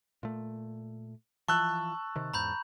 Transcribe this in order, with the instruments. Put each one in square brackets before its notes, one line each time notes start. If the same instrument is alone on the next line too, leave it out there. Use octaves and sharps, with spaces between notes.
[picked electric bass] A#2 A3
[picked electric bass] E3 F3 [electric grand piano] A5 E6 F#6 [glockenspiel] C#6
[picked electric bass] C3 D#3
[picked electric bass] E2 G#2 [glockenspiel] A#5 B5 G6